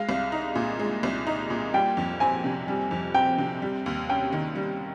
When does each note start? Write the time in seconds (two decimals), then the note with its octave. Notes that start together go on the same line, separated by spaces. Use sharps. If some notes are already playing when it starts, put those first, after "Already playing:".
Already playing: G#3 F5
0.09 C2
0.32 D#4
0.55 A#2
0.79 G#3
1.03 C2
1.27 D#4
1.50 A#2
1.74 G3 G5
1.97 F2
2.20 C4 G#5
2.44 C3
2.68 G3
2.91 F2
3.14 C4 G5
3.38 C3
3.62 G3
3.86 D#2
4.09 C#4 G5
4.32 D#3
4.56 G3